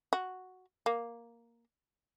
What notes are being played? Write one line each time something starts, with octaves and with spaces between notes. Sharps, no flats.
F#4
A#3